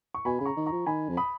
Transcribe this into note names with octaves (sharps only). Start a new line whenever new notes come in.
C#6
B2 G#5 B5
C#3 B5
A#5 C#6
D#3
A#5 C#6
F3
D#3 G#5 B5
F2
B5 D#6